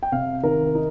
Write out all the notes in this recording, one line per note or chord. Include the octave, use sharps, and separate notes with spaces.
G5
C3 F5
D#3 A#4
D#4